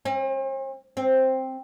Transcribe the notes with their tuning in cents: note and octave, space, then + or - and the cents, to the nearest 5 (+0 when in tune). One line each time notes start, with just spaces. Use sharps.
C4 +45
C4 +5